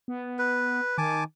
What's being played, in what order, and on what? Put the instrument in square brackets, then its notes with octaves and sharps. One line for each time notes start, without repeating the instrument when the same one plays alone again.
[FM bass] B3
[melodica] B4
[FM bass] D#3 [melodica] G#5 A5 D6